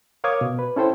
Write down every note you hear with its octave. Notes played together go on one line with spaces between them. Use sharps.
A#4 C#5 F5 D6 D#6 G#6
B2
B4
C#4 E4 A4 C5 G5